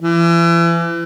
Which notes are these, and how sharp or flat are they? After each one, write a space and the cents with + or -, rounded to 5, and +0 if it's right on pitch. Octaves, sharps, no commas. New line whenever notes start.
E3 +35